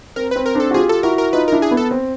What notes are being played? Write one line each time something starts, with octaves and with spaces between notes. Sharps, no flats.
C4 A#4
C4 B4
A#4
C4 D4 A4
F#4
F4 G4 G#4
A4
E4 F#4 A#4
A#4
D#4 F4 B4
D4 E4 A#4
G#4
B3
A4
C4